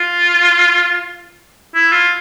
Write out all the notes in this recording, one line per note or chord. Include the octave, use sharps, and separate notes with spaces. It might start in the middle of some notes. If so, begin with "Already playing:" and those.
Already playing: F4
E4
F4